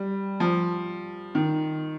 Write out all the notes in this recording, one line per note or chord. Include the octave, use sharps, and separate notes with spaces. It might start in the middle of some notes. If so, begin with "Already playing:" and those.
Already playing: G3
F3
D#3